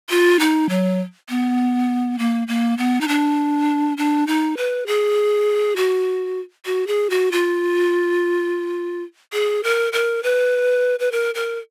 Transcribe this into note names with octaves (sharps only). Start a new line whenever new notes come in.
F4
D#4
F#3
B3
A#3
A#3
B3
D#4
D4
D4
D#4
B4
G#4
F#4
F#4
G#4
F#4
F4
G#4
A#4
A#4
B4
B4
A#4
A#4